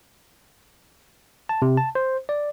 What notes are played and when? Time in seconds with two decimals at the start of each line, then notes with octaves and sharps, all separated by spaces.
1.49 A5
1.62 C3
1.77 A5
1.95 C5
2.29 D5